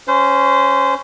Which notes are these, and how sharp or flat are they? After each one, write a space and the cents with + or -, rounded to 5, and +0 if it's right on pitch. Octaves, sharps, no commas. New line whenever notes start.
C#4 +0 C5 -20